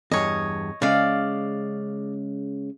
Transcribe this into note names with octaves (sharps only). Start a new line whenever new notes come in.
E2 G2 C#5 D#5
C#3 G#3 D5 F5